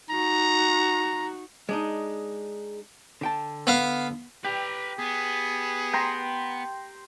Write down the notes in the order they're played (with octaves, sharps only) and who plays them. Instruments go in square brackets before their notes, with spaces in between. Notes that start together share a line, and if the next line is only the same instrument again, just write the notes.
[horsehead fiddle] D#4 F#4 [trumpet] A#5
[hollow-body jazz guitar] G#3 D4 D#4
D3 G5 A5
[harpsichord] B3 F5
[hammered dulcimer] G4 [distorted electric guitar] B4 A#5
[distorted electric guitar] B3 [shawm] G#4
[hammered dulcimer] G5 A#5 C6